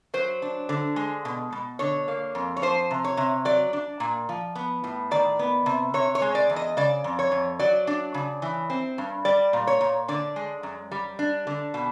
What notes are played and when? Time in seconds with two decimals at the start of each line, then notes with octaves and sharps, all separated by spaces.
0.14 F#3 C5
0.42 D4
0.69 D3
0.96 G#3
1.25 B2
1.52 B2
1.79 D3 C#5
2.08 A#3
2.35 F2
2.57 C#5
2.62 F3 C5
2.91 C3
3.04 C#5
3.17 C3
3.45 F#3 D5
3.73 D4
4.00 A#2
4.29 F3
4.55 B3
4.84 A2
5.11 D#3 D5
5.39 B3
5.66 C3
5.94 C3 C#5
6.15 C#5
6.22 G#3
6.35 D5
6.50 E2
6.56 D#5
6.77 C#3 D5
7.04 F2
7.19 C#5
7.32 F2
7.59 F#3 D5
7.87 D4
8.14 C#3
8.42 E3
8.70 C4
8.98 G2
9.25 G3 D5
9.53 A#2
9.67 C#5
9.81 A#2
10.08 D3 D5
10.36 G#3
10.63 F#2
10.91 G3
11.19 D4
11.47 D3
11.74 B2